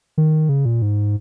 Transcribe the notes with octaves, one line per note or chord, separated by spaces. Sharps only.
D#3
C#3
A#2
G#2